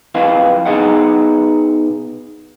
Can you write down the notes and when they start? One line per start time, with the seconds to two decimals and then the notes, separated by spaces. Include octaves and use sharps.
0.15 F2 E4 B4 D#5 F5
0.66 B2 D#4 G#4 D#5 F#5